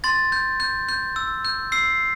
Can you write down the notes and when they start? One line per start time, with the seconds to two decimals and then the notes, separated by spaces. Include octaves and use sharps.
0.04 C6 A6
0.32 G6
0.60 G6
0.89 G6
1.16 E6
1.45 G6
1.72 E6 C7